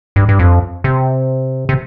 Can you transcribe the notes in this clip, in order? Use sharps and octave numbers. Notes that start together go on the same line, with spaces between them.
G2
G2
F2
C3
C3